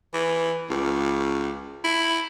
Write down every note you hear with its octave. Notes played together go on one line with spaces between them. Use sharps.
E3
C#2
E4